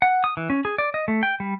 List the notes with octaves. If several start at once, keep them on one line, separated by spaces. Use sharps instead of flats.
F#5
D#6
E3
C#4
G#4
D5
D#5
A3
G5
G3